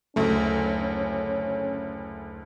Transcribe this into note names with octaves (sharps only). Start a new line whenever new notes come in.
F#1 D2 A3 C#4